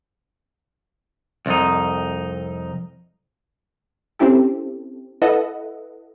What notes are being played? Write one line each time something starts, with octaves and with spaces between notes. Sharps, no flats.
C2 F2 D#4
C4 C#4 E4 G4 A4
E4 A4 B4 D#5 E5 F#5